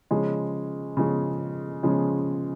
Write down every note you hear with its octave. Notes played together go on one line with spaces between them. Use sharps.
C#3 F3 G#3 C#4
C#3 F3 G#3 C#4
C#3 F3 G#3 C#4